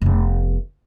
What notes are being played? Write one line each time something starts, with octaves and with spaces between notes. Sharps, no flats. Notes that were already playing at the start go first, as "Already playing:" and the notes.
F1 B3